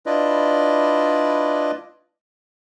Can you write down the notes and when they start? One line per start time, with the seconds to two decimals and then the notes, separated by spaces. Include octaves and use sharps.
0.06 D4 E4 F4 B4 D5 D#5